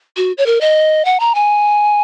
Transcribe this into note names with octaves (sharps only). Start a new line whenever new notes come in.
F#4
C#5
A#4
D#5
F#5
A#5
G#5